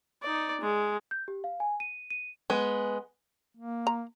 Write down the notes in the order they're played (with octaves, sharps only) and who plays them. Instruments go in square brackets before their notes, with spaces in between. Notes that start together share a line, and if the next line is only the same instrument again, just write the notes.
[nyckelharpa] D#4 D5
G#3
[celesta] G6
G4
F5
G#5
D#7
D#7
[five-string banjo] G#3 B3
[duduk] A#3
[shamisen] A#5